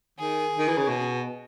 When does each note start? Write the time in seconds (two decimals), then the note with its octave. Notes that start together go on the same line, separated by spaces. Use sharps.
0.19 D#3 G#4
0.58 D#3
0.68 E3
0.78 C#3
0.88 B2